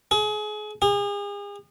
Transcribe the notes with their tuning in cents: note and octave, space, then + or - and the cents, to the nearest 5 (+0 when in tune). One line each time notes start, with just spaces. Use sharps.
G#4 +30
G#4 -40